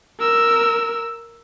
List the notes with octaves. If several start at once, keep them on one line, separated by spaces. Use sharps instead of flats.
A#4 E6